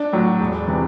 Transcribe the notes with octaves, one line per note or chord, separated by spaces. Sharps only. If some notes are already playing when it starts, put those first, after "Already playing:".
Already playing: D4
A2 F#3
E1
C3 E3